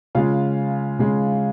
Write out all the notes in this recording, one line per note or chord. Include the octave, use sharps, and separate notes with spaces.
C#3 G#3 F4 F5
C#3 G#3